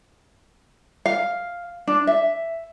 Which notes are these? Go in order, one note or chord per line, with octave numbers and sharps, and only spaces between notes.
F5
D4
E5